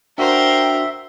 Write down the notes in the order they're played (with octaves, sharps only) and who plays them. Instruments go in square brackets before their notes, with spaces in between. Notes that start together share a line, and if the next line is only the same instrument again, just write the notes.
[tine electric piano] D4 F#4 [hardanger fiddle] A#4 C5 [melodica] E5 [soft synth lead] G5